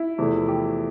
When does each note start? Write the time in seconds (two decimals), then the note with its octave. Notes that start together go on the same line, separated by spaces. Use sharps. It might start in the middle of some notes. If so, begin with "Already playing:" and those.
Already playing: E4
0.18 E2 C3 F3 A3
0.48 G4